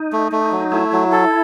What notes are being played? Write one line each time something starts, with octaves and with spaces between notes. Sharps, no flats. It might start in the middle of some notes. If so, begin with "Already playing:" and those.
Already playing: D#4
A3
A3
F#3
A3 E4
F#3
A4